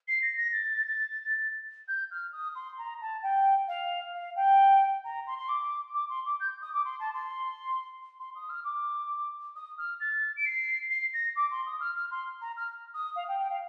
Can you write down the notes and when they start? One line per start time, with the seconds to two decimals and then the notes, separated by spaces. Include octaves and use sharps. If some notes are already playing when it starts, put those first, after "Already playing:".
0.08 C7
0.22 A#6
0.37 A#6
0.52 A6
1.88 G6
2.11 F6
2.32 D#6
2.55 C6
2.78 A#5
3.01 A5
3.23 G5
3.68 F5
4.14 F5
4.36 G5
5.04 A#5
5.27 C6
5.38 C6
5.48 D6
5.94 D6
6.09 C6
6.25 D6
6.40 G6
6.62 D#6
6.73 D6
6.85 C6
6.99 A5
7.14 C6
8.19 C6
8.35 D#6
8.49 F6
8.64 D6
9.56 D#6
9.78 F6
10.00 A6
10.36 D7
10.45 C7
10.90 C7
11.13 A#6
11.36 D6
11.51 C6
11.66 D#6
11.80 F6
11.96 F6
12.11 C6
12.41 A#5
12.57 F6
12.94 D#6
13.16 F5
13.28 G5
13.39 G5
13.49 F5